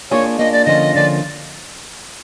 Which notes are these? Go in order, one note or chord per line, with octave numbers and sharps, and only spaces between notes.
A#3 D4 F4 G#4 C#5
A#3 D4 F4 G#4 D#5
D5
D3 F3 A#3 C#4 F4 D#5
D3 F3 A#3 C#4 F4 D5